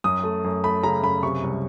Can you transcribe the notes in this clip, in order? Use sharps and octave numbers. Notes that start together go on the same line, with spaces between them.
F#2 D#6
A3
F#2
A3 B5
C#3 A#5
F#2 B5
C3 C#6
C2